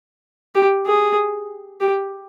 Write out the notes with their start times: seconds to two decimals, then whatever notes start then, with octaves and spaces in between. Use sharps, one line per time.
0.55 G4
0.86 G#4
1.81 G4